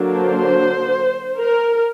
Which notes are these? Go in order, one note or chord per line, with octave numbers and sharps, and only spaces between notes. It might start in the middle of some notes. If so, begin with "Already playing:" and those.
Already playing: D3 F#3 A#3 D4
C5
A#4